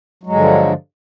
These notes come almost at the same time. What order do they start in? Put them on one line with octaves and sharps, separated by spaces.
F#3 G#3 G2 D3 F3